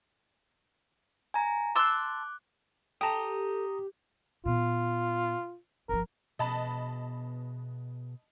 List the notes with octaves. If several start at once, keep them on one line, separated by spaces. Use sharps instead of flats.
G#5 A#5
A5 C6 D6 E6 F#6
G4 A4 G5 A5 A#5 D#6
A#2 B3 F4
G1 F3 A#4
B2 B3 G#4 D#5 A5 B5